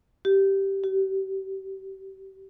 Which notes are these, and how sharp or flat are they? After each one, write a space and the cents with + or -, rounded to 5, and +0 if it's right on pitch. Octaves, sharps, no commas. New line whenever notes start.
G4 -10
G4 -35